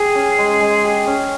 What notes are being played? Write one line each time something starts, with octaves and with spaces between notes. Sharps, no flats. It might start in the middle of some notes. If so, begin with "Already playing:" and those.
Already playing: G4 G#4
C#4
G#3
G#3
G4
C#4